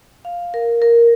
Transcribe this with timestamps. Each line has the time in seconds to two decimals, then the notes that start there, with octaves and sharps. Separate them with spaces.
0.25 F5
0.54 A#4
0.82 A#4